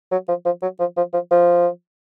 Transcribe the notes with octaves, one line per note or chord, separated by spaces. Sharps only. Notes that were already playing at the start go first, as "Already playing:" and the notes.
F#3
F3
F3
F#3
F3
F3
F3
F3